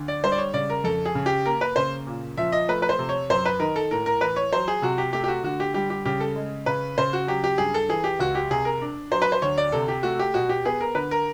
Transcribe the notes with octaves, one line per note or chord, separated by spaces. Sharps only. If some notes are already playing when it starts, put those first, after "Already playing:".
Already playing: D2 D3
D5
G3 C5
D5
C#5
C#3 D5
A#4
F2 A4
G#4
C#3
G4
A#3 A#4
B4
C#3 C5
A#2
F3 E5
D#5
A3 B4
B4
C5
C3
C#5
F#2 C5
B4
D#3 A#4
A4
A2 A#4
A#4
E3 B4
C#5
F#3 C5
G#4
C3 F#4
G4
A3 G4
G4
F#4
D3 F#4
G4
G3 G4
G4
C#3 G4
A4
G#3
C#3 B4
C#3 C5
F#4
F#3 G4
G4
G2 G#4
A4
E3 G#4
G4
C#2 F#4
G4
C3 G#4
A#4
D4
F#3 C5
B4
C5
D2 C#5
D5
C3 A4
G4
A3 F#4
G4
B2 F#4
G4
B3 G#4
A#4
D3 B4
A#4